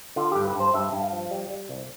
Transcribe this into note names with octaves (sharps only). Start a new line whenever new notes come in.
D3 F4
G2 G4
B4
G2 C5
G2 E5
G2
F5
F3
G3
G3
C2